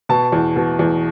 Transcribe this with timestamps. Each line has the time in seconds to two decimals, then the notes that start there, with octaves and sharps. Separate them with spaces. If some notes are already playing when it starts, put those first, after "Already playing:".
0.09 B2 A5
0.32 E2
0.56 B2
0.79 E2